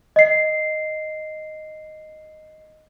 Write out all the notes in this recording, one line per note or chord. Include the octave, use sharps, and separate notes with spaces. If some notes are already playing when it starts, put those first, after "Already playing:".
D#5 C7